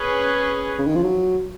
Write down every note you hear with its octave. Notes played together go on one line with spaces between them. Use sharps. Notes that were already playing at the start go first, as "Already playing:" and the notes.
Already playing: C#4 G#4 B4
C#3
D#3
F3
F#3